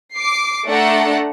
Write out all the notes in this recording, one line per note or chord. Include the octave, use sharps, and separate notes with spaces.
D6 C7
A3 D4 A4 F#5 A#5